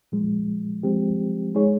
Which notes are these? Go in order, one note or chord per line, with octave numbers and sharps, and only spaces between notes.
A#2 F3 G#3
F3 G#3 C4 G4
G#3 D#4 G#4 C#5